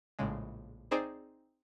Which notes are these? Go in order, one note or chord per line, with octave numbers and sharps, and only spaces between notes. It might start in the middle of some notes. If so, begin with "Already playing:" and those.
A#1 A2 C#3 G#3
C4 D#4 G#4 C5 D5